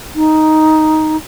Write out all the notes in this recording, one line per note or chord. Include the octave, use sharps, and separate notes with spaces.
D#4